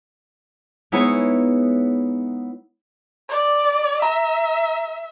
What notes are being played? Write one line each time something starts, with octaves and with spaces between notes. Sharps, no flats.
G#3 B3 D#4 E4 G#4 C#5
D5
E5 A#5